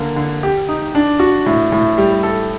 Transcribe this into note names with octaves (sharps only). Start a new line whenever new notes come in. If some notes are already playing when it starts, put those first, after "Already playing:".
Already playing: D3 A#3
D3
G4
D#4
D4
F#4
A2
A2
G3
A4